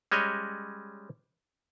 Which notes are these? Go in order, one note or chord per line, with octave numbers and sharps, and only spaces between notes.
G3 G#3 C#4 C#5 D#5